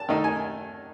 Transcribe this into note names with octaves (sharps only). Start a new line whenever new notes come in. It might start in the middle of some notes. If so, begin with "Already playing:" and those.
Already playing: A5
D#3 A3 D#4
G#5